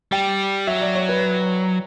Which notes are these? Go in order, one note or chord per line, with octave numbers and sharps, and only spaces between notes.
G3 G5
F#3 E5
D5
C#5
B4